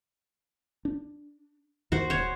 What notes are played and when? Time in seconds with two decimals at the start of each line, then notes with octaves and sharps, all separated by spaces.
0.85 D4
1.92 D#2 D#3 F#4 C5
2.10 D#1 C5 C#5